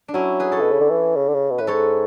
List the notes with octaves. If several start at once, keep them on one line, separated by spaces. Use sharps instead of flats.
D4
F#3 C#4 E4
G#4 B4
A4 C#5
B2
C#3
D3
E3
C#3
D3
C#3
B2
A2 B4
G#2 A4 C#5